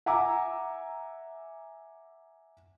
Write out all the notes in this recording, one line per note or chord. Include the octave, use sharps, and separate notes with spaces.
E5 F#5 G#5 A#5 D6 E6